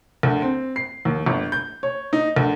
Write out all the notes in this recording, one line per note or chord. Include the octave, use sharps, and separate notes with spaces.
D2
C4
C7
D#2
G1
G6
C#5
D#4
D2